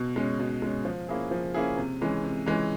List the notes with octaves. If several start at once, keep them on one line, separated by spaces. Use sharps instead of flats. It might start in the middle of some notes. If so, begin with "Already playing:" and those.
Already playing: B2
G#3 C#4
B2
G#3 C#4
F3
A#3 C#4 E4 G#4
F3
A#3 C#4 E4 G#4
C3
E3 G#3 C#4
C3
E3 G#3 C#4